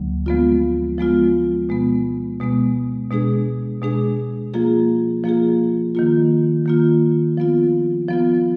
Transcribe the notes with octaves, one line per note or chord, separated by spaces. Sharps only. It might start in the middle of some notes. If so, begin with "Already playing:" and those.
Already playing: D2 D3 F#3 A#3
F3 G#3 B3 F4
F3 G#3 B3 F4
B2 G#3 B3
B2 G#3 B3
B2 G#3 D4 G#4
B2 G#3 D4 G#4
F3 A#3 F4 G#4
F3 A#3 F4 G#4
D#3 A#3 F4
D#3 A#3 F4
F3 B3 F4
F3 B3 F4